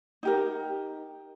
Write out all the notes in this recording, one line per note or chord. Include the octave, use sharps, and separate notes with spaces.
D#4 G4 A#4